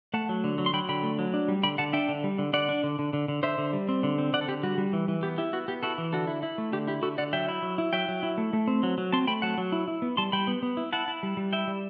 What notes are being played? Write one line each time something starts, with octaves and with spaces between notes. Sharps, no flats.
A3 F#5 A5
F#3
D3
F#3
C6
F#3 G5 B5
D3 G5 B5
A3
F#3
D4
G3
D3 G5 B5
D3 F#5 A5
D4 E5 G5
D3
G3
D3
D3 D5 F#5
D4
D3
D3
D3
D3
D3 C5 E5
D3
G3
C4
D3
C4
D3 D5 F#5
A4
D3 G4
G3 F#4
G3
E3
E3
B3 G4
E4 G4
B3 F#4
B3 G4
E4 F#4 A4
E3
D3 F#4 A4
E4
E4
A3
D3 G4
E4 G4
D3 F#4 A4
D3 D5 F#5
F#3 E5 G5
E4
F#3
E4
F#3 E5 G5
F#3
E4
A3
A3
C4
F#3
F#3
C4 A5 C6
A3 G5 B5
F#3 F#5 A5
F#3
E4
E4
B3
G3 A5 C6
G3 G5 B5
B3
B3
E4
E4 F#5 A5
E4
G3
G3
E4 E5 G5
G3